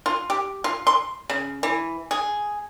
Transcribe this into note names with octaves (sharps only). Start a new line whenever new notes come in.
F4
G4
F4
C6
C#3
E3
G#4